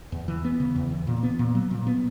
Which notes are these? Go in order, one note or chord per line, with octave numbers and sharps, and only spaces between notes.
E2
E3
B3
C#3
E2
E3
A#2
B3
A#2
F#3
A#2
B3